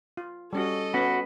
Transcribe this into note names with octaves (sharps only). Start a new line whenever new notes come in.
F4
G3 C#4 F#4 A4 D#5
B3 C#4 F#4 B5